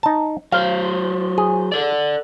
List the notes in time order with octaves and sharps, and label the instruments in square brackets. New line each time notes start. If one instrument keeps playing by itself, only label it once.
[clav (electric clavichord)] D#4 A5
[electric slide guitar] F#3 C5 [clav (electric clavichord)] F5
[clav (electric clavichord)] G#4
[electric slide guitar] A4 D5